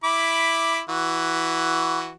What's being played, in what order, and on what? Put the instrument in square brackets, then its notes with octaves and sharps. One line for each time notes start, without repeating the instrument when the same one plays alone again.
[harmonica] E4 B5 D6
E3 F#4